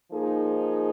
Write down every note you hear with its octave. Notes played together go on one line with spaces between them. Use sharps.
F3 A#3 D#4 G#4